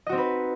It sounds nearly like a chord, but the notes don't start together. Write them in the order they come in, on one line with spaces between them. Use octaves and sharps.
D#5 F#4 C4 D#4 B4